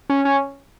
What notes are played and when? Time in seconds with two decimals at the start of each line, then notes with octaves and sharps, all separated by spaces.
0.09 C#4
0.25 C#4